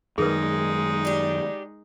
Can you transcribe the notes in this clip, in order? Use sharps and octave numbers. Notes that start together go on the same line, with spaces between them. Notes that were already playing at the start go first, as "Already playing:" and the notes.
F#2 D#3 G#3 D#4 G#4 A#4 B4
D4 G4